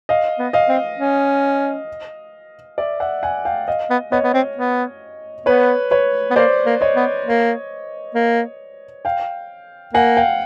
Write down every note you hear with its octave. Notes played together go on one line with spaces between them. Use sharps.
D#5 F5
B3
D#5 F5
C4
C#4
D5 E5
E5 F#5
F#5 G#5
F5 G5
D#5 F5
B3
B3 C#5 D#5
B3
C4
B3
B3 B4 C#5
B4 C#5
B3
A#3 C5 D5
A#3
C#5 D#5
B3
A#3
A#3
F5 G5
A#3 F#5 G#5
F5 G5